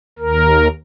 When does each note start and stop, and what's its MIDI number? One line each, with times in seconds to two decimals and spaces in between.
0.19 0.68 39
0.19 0.68 70